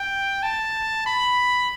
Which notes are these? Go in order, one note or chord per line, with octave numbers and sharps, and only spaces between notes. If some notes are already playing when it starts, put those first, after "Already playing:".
Already playing: G5
A5
B5